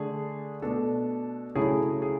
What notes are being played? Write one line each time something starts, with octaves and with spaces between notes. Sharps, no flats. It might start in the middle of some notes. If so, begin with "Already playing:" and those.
Already playing: D3 A3 D4 G#4
B2 A3 D4 A4
C#3 F#3 A3 E4 G#4
G#4